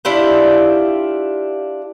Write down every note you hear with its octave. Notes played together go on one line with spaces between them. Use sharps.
D4 E4 F4 G4